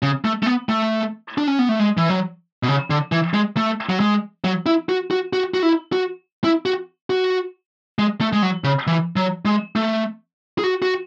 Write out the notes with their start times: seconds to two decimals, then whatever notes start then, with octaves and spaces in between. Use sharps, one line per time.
0.03 C#3
0.25 A3
0.43 A3
0.46 B3
0.69 A3
1.38 D4
1.47 C#4
1.59 B3
1.69 A3
1.79 G#3
1.97 E3
2.10 F#3
2.63 B2
2.68 C#3
2.90 D3
3.12 E3
3.34 G#3
3.57 A3
3.89 F#3
4.00 G#3
4.45 F#3
4.66 E4
4.89 F#4
5.11 F#4
5.33 F#4
5.54 F#4
5.63 E4
5.92 F#4
6.44 E4
6.66 F#4
7.10 F#4
7.99 G#3
8.21 A3
8.33 G#3
8.42 F#3
8.64 C#3
8.87 E3
9.16 F#3
9.45 G#3
9.76 A3
10.59 G#4
10.64 F#4
10.82 F#4